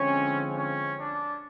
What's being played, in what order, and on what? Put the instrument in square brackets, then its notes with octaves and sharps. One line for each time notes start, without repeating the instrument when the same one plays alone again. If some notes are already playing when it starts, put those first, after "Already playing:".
Already playing: [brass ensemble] D3 F3 G#3 C4 C#4
C#4
D4